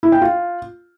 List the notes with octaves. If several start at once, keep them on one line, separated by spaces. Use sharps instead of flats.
E4
G5
F4